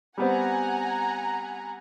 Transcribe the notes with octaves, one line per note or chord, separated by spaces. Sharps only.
G3 B3 C4 F#5 G#5 A#5